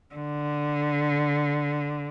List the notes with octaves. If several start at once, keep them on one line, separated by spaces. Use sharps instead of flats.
D3